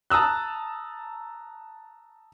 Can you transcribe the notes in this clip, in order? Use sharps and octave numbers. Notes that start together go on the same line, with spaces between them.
A5 A#5 D#6 E6 F#6